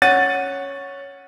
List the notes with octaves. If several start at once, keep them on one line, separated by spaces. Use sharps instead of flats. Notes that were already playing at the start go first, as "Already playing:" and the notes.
C#4 F#5 A6 D#7